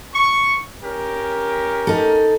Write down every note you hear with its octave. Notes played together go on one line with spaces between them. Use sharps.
C#6
C#4 G4 A#4
D#4 A4